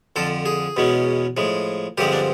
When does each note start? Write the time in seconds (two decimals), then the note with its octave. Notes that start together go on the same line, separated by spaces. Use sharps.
0.16 F2 D3 F3 A4
0.46 G#4
0.77 E2 B2 G#3 C#4
1.37 A2 F3 G#3
1.98 G2 D3 F3 G#3 C4 G4
2.13 D4